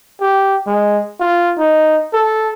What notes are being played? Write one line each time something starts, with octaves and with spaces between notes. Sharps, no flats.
G4
G#3
F4
D#4
A4